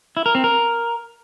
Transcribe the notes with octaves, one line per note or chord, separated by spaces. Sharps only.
E4
A#4
C4
A#4